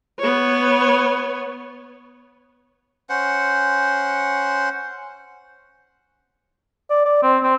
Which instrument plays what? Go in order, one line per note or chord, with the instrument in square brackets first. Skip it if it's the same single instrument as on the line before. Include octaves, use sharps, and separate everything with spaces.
[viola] B3 C#5
[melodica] C#4 C5 F#5
[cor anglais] D5
D5
C4
C4